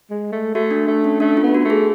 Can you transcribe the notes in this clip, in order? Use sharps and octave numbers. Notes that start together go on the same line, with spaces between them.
G#3
A3
A3 F#4
D4
A3
C#4
A3 D4
F4
B3
F#4
A3
G#4